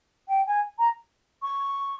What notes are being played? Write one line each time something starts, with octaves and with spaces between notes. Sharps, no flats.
G5
G#5
A#5
C#6